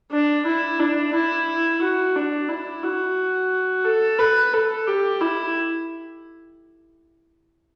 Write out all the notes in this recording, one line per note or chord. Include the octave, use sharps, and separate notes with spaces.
D4
E4
D4
E4
F#4
D4
E4
F#4
A4
B4
A4
G4
E4